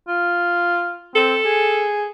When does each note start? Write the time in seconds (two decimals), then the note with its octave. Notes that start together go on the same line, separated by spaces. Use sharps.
0.08 F4
1.15 C4 A4
1.45 G#4